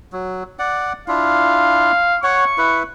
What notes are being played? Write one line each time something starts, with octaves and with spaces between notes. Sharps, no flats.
F#3
D5 F#5
D4 E4 F4 F5
C#5 F#5 C#6
E4 B4